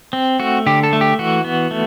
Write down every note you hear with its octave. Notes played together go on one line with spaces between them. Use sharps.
C4
A3 F#4
D3 G4
A4
A3
G4
E3 F#4
B3
A3